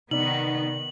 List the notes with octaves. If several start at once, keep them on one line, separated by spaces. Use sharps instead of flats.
C3 D#3 B3 D#4 D5 F#7